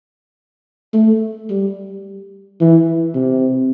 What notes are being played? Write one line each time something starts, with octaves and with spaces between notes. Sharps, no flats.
A3
G3
E3
C3